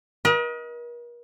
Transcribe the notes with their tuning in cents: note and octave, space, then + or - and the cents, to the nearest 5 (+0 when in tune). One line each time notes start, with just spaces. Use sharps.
A#4 +45 D#5 +25